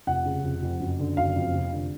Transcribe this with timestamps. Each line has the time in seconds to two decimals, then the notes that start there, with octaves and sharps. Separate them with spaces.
0.07 F1 F#5
0.25 C#3
0.44 F1
0.62 F2
0.80 F#1
0.99 D3
1.17 F#1 F5
1.36 F2
1.54 F1
1.73 D3